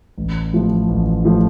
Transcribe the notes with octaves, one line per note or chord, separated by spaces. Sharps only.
A1
A2 F3 A3
A1
A2 F3 A3